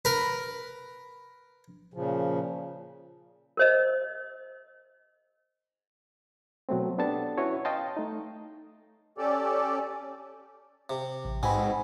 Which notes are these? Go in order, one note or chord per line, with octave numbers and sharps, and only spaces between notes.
A#4 B4
A#2 C#3 F3
A#4 C5 D#5
B2 F#3 A3 C4
B3 D4 G4 A4 A5
C#4 E4 F#4 B4 C#5
D#5 F5 G5 A5 C6
A3 D#4
C#4 G4 A4 D5
C3
A1
G#2 B2 C4 G#5 B5